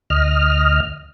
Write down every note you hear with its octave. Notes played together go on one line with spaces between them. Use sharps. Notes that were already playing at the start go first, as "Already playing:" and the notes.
D2 D#5 F6